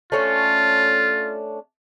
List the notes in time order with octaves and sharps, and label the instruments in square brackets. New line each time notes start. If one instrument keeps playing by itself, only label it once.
[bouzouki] A3 C#4 D4 [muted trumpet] F4